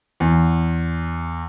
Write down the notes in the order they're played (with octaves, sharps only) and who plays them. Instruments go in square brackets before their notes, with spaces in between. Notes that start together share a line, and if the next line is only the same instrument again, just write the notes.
[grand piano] E2